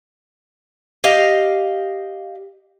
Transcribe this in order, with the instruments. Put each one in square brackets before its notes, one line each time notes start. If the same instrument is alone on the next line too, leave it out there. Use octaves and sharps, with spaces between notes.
[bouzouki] G4 D#5 F5